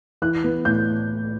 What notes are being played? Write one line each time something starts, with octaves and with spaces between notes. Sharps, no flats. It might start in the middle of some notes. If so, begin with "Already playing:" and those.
E3 F#6
B3
A2 G6